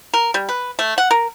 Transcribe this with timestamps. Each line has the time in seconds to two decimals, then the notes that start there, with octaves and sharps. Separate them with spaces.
0.14 A#4
0.34 G3
0.49 B4
0.79 A3
0.98 F#5
1.11 A#4